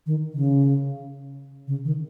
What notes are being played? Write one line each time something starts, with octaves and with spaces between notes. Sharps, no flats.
D#3
C#3
C#3
D#3